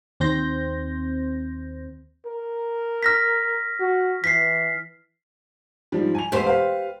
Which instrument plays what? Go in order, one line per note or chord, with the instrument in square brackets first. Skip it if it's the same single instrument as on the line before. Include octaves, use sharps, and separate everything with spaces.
[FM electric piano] D#2 C4 C5 G6 A#6
[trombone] A#4
[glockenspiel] F6 A#6 B6
[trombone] F#4
[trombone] E3 [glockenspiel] B6 C7
[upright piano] G#2 F3 G3
G#5 F7
[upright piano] E1 A3 B4 [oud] G4 C5
[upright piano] B4 F5